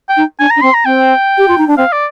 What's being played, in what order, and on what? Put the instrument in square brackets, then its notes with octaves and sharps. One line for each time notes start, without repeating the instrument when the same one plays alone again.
[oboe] G5
[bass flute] D#4
[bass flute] D4 [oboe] G#5
[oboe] A#5
[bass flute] D4
[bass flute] C4 [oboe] C6
[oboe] A#5
[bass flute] C4 [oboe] G5
[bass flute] G4
F4
D#4
D4
[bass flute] C4 [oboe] F5
[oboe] D5